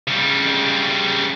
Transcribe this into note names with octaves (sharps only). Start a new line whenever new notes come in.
C#3 G3